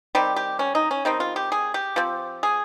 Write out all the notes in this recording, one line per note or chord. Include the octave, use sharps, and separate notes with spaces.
D#3 G3 C4 G4
G4
C#4
D#4
C#4
D#3 G3 C4 D#4
F4
G4
G#4
G4
F3 C4
G#4